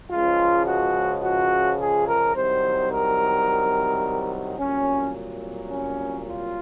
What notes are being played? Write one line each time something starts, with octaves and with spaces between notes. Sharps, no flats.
C#2 C#3 F3 G#3 F4
F#4
F#4
G#4
A#4
C2 C3 D#3 F#3 C5
A#4
C2 A#2 F#3 C#4
C#4
F4